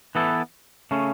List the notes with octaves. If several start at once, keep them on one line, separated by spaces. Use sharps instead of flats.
E3 B3 E4 A4
C#3 A3 C#4